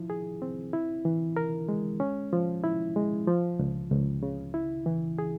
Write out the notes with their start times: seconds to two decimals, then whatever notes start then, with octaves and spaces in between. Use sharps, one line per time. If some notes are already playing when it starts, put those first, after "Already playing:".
Already playing: F3 E4
0.10 G#4
0.42 C4
0.73 E4
1.05 E3
1.37 A#4
1.69 G#3
2.00 C#4
2.33 F3
2.64 E4
2.96 G#3
3.27 F3
3.59 C#2
3.91 C#2
4.23 C#3
4.54 E4
4.86 E3
5.18 G#4